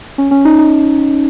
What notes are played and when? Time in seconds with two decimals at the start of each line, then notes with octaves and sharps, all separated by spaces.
0.18 C#4
0.31 C#4
0.45 D#4
0.59 D#4